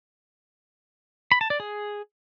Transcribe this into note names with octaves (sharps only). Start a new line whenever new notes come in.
B5
A5
D5
G#4